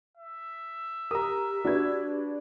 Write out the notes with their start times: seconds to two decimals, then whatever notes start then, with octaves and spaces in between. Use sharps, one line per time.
0.17 E5
1.11 G4 A#4 A#5 D#6
1.65 D4 F#4 B4 G#6